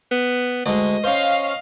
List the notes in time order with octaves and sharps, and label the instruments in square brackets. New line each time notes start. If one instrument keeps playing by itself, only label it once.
[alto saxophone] B3
[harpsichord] D2 G#3 [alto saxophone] D#5
[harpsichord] C#4 C5 [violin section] F5